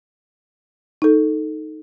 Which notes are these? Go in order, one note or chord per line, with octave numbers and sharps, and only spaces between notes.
D#4 A4